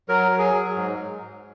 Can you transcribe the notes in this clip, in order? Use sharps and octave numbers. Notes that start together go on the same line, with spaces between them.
F#3 A#4
F#3
G#4
F#3
G#2